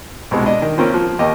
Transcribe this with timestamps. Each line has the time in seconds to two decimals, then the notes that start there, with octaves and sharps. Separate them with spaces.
0.31 C2 B2 G#3
0.44 D4 D#5
0.62 D#3
0.78 A#3 C4 C#4 F4
0.94 F3
1.19 D#2 A#3 G4 D#5